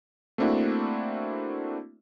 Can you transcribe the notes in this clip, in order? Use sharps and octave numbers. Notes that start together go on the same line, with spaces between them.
A3 A#3 C4 D4 E4 F#4